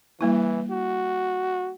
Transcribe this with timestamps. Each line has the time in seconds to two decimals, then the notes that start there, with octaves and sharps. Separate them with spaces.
0.21 E3 G3 A#3 E4
0.71 F#4